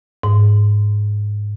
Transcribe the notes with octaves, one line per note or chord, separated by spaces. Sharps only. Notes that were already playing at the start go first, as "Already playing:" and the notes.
G#2